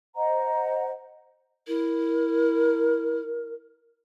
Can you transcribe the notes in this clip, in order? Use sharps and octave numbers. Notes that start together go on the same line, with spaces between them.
C5 D#5 F#5 A#5
E4 A#4